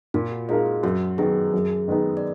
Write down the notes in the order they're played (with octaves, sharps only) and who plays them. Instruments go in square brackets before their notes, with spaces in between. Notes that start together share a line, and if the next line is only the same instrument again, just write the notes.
[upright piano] A#2 [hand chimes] F4
[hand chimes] F#4
[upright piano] G#3 D#4 A#4 F5 [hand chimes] F4
[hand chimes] F#4
[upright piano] F#2 [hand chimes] F#4
[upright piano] D#3 F#3 B3 [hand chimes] G#4
[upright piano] F#2
D#3 G#3 B3 D#4
[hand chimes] D5